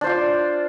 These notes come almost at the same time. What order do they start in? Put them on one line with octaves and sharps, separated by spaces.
D4 C5 F4 D5